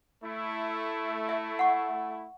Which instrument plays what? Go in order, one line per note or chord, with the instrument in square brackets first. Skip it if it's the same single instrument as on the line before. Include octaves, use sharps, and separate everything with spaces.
[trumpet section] A3 E4
[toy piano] E5
F#5 C#6